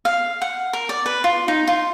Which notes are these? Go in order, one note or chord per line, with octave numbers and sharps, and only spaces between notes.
F5
F#5
A#4
D5
B4
F4
D#4
F4